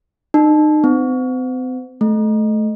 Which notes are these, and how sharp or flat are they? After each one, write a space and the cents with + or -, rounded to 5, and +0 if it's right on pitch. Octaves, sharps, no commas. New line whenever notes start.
D#4 -30
C4 -40
A3 -25